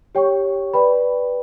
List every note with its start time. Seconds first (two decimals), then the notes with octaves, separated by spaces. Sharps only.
0.15 G4 C#5 G5 C#6
0.73 B4 D5 G5 B5